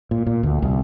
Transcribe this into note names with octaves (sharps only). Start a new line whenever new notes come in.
A#2
A#2
D2
C2